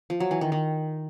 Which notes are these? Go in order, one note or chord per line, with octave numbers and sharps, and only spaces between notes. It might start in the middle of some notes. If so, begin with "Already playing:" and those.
F3
F#3
E3
D#3
D#3